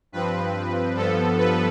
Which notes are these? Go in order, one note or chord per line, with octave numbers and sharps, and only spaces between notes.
G2 F3 C4 B4
G2 F3 B3 A4
B4